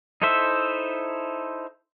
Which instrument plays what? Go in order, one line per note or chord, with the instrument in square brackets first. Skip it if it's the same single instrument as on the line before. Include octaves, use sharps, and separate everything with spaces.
[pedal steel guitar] D#4 E4 A4 C5 E5